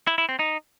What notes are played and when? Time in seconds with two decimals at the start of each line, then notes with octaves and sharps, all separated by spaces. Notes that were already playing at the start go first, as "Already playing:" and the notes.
0.07 E4
0.18 E4
0.29 C4
0.39 D#4